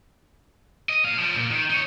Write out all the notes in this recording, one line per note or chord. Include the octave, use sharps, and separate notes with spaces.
D#5
A#2 F5
F3 G3
A#2
D#3
D#4 C#5